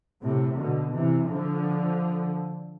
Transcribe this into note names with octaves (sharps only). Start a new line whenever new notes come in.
A2 C3
B2 D3
C3 E3
D3 F3